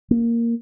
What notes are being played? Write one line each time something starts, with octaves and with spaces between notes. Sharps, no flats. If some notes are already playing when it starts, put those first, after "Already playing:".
A#3